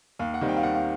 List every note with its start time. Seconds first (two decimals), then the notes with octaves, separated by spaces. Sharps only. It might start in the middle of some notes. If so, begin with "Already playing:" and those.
0.19 D#2 F5
0.34 F#5
0.41 D#3 G3 C4
0.49 G5
0.57 F5
0.63 D#2 F#5
0.75 F5